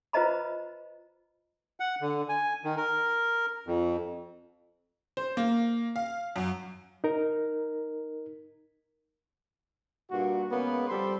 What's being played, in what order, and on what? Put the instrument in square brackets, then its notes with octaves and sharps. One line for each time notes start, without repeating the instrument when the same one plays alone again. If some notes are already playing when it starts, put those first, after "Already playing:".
[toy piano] F4 B4 C5 D#5 A#5 B5
[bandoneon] F#5
D3
G#5
D#3
A#4
F2
[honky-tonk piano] C5
A#3
F5
F#2
[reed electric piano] D#4 A#4
[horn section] G2 A#2 F#4
C#3 G#3 A#3 B3
F3 G3 C4 A4 B5 C6